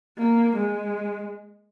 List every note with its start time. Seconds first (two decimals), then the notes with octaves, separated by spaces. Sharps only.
0.18 A#3
0.56 G#3